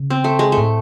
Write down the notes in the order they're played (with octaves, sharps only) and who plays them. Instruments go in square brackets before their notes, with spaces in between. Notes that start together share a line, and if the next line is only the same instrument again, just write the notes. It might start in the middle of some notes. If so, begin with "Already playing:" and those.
Already playing: [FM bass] C#3
[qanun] C4
A3
G#3
A3
[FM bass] A2